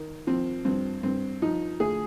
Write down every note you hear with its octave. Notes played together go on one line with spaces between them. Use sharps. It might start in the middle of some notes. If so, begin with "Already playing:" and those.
Already playing: D#3
F3 C4
G2 C4
G2 C4
F3 D#4
D2 G#4